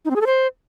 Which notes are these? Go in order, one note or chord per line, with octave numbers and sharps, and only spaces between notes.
D#4
C4
G#4
A4
C5